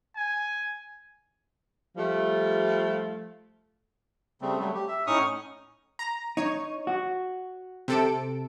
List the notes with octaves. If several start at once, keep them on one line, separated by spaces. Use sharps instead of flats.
G#5
F3 G3 A3
C#3 G3 A3 C4
F#3 G3 A3
G4
E5
A2 C#4 D#4 C#6 D#6 F6
A#5
D#4 C#5
F#4
C3 A4 D7